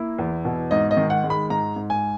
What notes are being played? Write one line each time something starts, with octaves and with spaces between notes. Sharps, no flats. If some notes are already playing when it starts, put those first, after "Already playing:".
Already playing: A#3 E4
E2
B2
G#2 D#5
D#5
D#3
F#5
G#3
B5
G#2 A#5
G#2
G#5